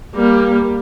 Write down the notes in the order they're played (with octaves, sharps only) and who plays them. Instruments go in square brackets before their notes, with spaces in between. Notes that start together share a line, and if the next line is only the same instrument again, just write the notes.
[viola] G3 A#3